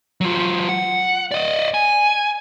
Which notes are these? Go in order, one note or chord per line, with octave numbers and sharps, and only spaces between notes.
F#3 F4
F#5
D5 D#5
G#5